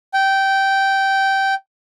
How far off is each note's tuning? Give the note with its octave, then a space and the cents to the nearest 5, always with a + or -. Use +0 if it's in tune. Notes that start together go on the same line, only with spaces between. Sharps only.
G5 -15